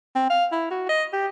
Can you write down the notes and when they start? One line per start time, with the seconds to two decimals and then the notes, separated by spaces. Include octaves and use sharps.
0.15 C4
0.30 F5
0.52 E4
0.71 F#4
0.89 D#5
1.13 G4